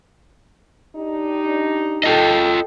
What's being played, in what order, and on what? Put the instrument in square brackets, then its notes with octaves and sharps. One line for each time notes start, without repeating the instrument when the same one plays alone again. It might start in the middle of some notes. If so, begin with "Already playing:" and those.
[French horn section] D4 D#4 G4
[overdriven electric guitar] F4 D#5 [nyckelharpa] A4 G5